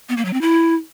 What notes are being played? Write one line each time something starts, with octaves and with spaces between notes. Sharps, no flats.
B3
A#3
F#3
C4
E4